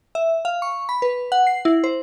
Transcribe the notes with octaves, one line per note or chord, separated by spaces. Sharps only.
E5
F5
C#6
B5
B4
F#5
C7
E4
C5